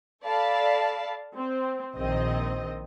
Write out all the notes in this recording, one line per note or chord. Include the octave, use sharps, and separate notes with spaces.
A4 D5 F5 A5 B5
C4
A#1 D#3 C4 D#5